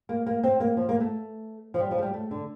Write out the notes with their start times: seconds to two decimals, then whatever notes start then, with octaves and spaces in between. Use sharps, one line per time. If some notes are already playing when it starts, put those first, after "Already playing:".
0.09 A#3
0.27 A#3
0.43 C4
0.60 A#3
0.77 F3
0.89 A#3
1.00 A3
1.74 F3
1.80 G3
1.91 F3
1.98 A3
2.02 G3
2.14 A3
2.31 D3